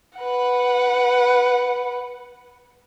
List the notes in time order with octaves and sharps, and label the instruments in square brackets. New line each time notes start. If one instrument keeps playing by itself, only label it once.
[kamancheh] B4 F#5